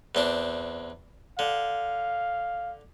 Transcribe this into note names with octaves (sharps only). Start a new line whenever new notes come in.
E2 C4 D4
D3 F5